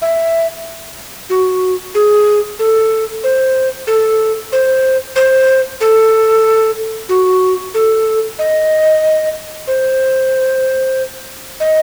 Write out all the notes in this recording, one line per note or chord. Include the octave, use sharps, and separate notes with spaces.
E5
F#4
G#4
A4
C5
A4
C5
C5
A4
F#4
A4
D#5
C5
D#5